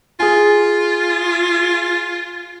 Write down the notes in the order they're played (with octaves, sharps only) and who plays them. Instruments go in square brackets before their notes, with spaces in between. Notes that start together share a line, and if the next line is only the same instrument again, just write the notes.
[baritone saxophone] F4 [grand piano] G#4 G#5